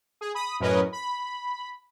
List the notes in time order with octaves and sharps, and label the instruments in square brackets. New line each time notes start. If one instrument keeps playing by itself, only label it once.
[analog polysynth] G#4
B5 D#6
F#2 A2 C#4 A#4 B4 D#5
B5